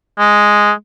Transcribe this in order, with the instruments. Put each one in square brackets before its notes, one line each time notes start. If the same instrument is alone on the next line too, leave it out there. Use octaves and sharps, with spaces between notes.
[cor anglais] G#3